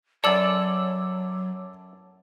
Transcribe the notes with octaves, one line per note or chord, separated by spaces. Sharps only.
F#2 F#3 A4 D5 A5 D6 E6 F#7